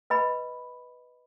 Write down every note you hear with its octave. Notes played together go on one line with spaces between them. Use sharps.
B4 D#5 B5